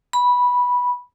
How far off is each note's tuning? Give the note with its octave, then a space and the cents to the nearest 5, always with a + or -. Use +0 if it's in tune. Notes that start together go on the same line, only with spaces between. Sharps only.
B5 -10